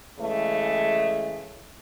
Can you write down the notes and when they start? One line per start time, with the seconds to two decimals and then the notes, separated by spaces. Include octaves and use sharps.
0.19 C#3 E3 G#3 A3